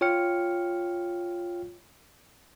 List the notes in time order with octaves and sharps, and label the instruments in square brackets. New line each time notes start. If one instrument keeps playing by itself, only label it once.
[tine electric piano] F4 C#5 G5 F6 C#7